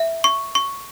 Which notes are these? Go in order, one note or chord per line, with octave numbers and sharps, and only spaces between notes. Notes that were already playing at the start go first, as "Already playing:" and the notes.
Already playing: E5
C#6
C#6